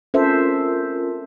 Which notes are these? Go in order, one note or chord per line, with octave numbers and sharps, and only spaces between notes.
C#4 F4 A4 A#4 C5 E5